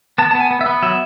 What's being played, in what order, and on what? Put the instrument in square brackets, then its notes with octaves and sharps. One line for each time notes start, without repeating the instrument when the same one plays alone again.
[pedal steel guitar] B3 A5
A5
B3
G#5
B3
E5
B3
F#3 E5